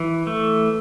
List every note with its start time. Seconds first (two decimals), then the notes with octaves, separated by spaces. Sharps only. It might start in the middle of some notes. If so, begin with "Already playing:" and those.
Already playing: E3
0.27 A3